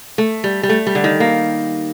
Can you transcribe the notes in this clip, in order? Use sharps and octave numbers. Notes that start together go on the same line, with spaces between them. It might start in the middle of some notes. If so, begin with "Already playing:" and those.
A3
G3
G3
A3
G3
D3
D#3
A#3